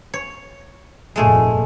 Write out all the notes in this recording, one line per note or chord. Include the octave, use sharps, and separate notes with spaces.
C#5
F1 G2 A#2 G#3 A3 G#4